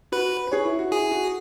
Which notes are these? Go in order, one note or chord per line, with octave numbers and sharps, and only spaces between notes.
F#4 B4
B4
G#4 C#5
E4
F#4
E4 G#4
F#4